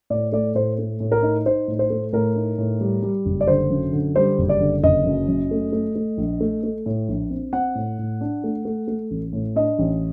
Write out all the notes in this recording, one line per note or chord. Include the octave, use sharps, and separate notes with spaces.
A2 D5
A3 D5
A2 C5
A3
A2
A#4
D#4
D#4 C5
A2
C5
A3
A2 A#4
D#4
A2
G3
G3
F#1
D5
D3 C5
F#2
D3
G3 C5
F#1
D5
D3
F#1 D#5
F#2
F#2
A3
A3
A3
A#1
A3
A3
A2
A#1
C4
C4 F#5
A2
A2
D4
A3
A3
A3
A1
A2
D4 D#5
A1